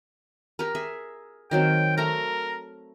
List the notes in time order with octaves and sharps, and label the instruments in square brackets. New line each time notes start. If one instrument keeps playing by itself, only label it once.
[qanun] G4 A#4
G#4 E5
[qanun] D#3 F#3 C4 [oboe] G5
[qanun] A3 A#5 [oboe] A#4